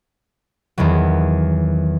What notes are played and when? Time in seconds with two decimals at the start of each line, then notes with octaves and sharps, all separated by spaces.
0.78 E2 D#3 E3 F#3